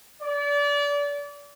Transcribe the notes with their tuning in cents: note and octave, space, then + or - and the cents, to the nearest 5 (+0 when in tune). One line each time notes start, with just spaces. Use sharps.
D5 -30